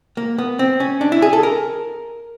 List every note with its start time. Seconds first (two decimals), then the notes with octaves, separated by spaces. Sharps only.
0.17 A#3
0.38 B3
0.59 C4
0.80 C#4
1.01 D4
1.12 E4
1.22 G#4
1.33 A4
1.43 A#4